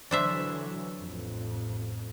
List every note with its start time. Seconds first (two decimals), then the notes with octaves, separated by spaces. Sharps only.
0.11 D3 E3 F#3 D4 C5 E5
0.97 A1 F2